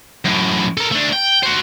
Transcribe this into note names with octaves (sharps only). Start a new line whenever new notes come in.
F#2 A2
A4 A#4
A3 D4
G5
F#4 C5